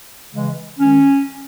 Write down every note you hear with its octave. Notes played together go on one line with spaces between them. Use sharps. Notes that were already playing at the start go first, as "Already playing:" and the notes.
C#3 E3 G#3
D#3 G#3 C#4